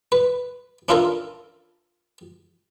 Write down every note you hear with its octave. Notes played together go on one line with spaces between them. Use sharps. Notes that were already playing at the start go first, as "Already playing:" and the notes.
B4
C#4 D4 E4 F4 A4 A#4